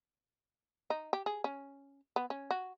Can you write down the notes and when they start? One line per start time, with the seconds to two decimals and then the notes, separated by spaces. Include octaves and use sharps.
0.90 D#4
1.13 G4
1.26 G#4
1.44 C#4
2.16 B3
2.30 C#4
2.51 F#4